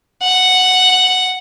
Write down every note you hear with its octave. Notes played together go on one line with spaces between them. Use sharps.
F#5